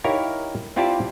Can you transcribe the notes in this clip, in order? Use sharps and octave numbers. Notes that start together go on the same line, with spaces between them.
D#4 E4 G4 A#4 C#5 F5
C4 E4 F4 G4 D5 A5